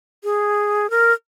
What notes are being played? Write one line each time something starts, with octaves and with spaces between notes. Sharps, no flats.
G#4
A#4